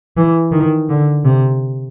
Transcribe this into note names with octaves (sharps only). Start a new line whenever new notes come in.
E3
D#3
D3
C3